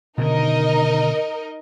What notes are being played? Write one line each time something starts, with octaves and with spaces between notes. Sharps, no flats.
B2 D3 D#3 D#4 A#4 D#5